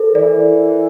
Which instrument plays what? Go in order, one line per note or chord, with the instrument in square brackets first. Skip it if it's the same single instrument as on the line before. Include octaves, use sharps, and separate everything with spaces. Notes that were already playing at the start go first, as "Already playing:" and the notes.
Already playing: [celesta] A4 A#4 C5
[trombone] E3 [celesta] D5